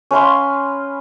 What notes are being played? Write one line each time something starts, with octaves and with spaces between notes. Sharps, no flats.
C#4 B4 F5 C6